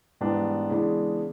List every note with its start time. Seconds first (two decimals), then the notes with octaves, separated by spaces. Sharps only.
0.21 G#2 E3 G3 B3 D4
0.70 C#3 E3 G#3 B3 D4